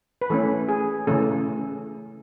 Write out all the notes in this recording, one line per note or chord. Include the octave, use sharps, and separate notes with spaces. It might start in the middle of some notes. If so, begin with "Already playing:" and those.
B4
E3 A3 C#4 A4
G#4
C#3 E3 A3 C#4 A4